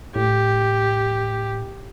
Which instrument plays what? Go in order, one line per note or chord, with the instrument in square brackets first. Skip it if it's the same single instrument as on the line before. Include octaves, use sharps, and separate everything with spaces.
[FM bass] A2 [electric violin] G4